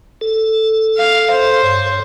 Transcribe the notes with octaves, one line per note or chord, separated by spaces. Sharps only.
A4
F5
C5
G2 C#5